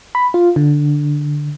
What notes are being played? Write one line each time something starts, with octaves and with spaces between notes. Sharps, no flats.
B5
F4
D3